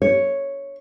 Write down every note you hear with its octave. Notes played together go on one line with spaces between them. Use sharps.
C#5